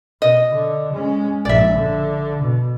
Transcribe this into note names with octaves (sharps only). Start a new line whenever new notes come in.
B2 D#5
D3
G#3 C#4
A#1 G#2 D5 E5
D3
B2